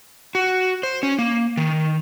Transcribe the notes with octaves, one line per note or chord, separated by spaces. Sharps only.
F#4
C5
C#4
A#3
D#3